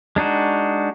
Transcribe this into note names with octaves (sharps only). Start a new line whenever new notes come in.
G#3 D4 D#4 F#4